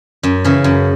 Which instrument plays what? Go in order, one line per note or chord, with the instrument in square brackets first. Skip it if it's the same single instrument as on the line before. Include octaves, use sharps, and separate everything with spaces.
[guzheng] F#2
C#3 E3
F#2